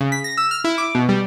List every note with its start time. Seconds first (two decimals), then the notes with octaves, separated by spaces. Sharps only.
0.01 C#3
0.12 B6
0.24 A#6
0.37 E6
0.51 F6
0.64 E4
0.78 D6
0.95 B2
1.09 G3